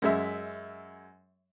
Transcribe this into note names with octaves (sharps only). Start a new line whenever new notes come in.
F#2 G#3 E5